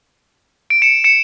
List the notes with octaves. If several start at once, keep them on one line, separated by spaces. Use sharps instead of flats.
D7
C#7 E7
C#7 E7